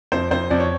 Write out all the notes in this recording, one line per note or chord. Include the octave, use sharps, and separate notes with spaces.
F2 C5
F2 C5
F2 D5
C#5